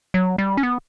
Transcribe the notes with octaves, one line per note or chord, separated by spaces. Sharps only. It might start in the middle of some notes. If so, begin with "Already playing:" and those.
F#3
G3
C#4
B3